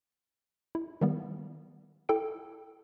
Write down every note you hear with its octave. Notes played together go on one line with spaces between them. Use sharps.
E4
D#3 G3 B3
E4 A4 G5 D7